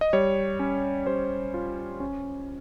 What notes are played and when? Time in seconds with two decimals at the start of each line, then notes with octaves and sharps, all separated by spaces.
0.01 D#5
0.13 G3 C#5
0.60 C#4
1.07 G3 C5
1.54 F4
2.00 C#4